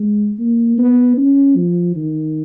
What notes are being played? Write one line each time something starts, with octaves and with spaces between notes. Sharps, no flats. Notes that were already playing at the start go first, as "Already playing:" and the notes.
Already playing: G#3
A#3
B3
C#4
F3
D#3